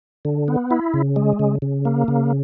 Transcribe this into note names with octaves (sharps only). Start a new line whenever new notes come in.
D3
B3
E4
C#3
G#3
C#3
C#3
A#3
C#3